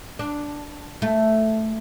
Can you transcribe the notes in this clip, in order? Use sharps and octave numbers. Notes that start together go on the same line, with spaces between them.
D4
A3